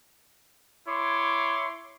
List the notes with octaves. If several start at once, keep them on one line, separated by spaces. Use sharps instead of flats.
E4 C#5 C6 D6